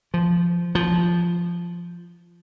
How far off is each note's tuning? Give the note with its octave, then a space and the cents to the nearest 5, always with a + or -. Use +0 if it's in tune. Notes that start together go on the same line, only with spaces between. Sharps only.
F3 -15
F3 -10